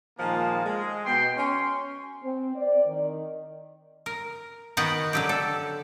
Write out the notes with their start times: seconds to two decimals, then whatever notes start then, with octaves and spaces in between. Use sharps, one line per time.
0.18 A#2 D#3 F3 G#3 A#3 A5
0.65 G#3
1.06 B2 G5 C6
1.37 C#4 C6
2.23 C4
2.55 D5
2.86 D#3
4.06 A#4
4.77 D#3 B3 F#4 F#5 G5
5.13 D3 F#3 G4
5.29 A4